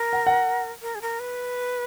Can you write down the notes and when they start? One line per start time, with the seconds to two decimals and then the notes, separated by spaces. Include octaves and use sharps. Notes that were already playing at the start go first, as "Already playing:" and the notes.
Already playing: A#4
0.13 F#5
0.27 F#5
0.82 A#4
0.95 G#4
1.02 A#4
1.20 B4